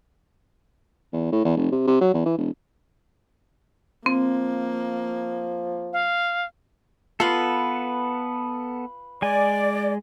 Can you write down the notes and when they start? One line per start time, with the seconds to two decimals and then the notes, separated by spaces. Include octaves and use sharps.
1.13 E2
1.32 A2
1.45 E2
1.57 F1
1.72 C3
1.87 C3
2.01 F#3
2.14 E2
2.25 E3
2.38 E1
4.06 F3 A#3 C4
5.93 F5
7.20 B3 F4 A4 B4
9.22 G#3 D5 G#5